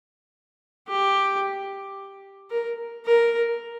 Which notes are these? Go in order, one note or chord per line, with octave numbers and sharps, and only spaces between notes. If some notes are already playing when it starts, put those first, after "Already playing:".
G4
A#4
A#4